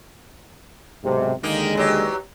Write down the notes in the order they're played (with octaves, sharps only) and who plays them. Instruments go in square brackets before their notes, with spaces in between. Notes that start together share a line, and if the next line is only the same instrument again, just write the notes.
[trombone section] B1 G#2 C3
[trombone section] D#2 D3 G#3 [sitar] D#3 A#3 D#4
[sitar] E2 F#3 G4